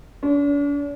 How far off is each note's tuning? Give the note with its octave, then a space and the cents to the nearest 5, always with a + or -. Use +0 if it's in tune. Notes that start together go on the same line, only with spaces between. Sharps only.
D4 -45